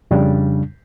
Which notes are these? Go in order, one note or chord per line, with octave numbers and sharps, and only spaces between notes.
F2 C#3 G3 D4